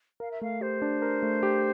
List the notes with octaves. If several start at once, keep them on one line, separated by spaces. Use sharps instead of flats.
A#4 F5
E5
A3 F5
G4 C5
D4
A#4
A3
G4